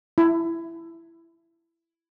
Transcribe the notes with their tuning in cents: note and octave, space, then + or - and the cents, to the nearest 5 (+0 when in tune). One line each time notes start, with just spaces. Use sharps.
E4 +15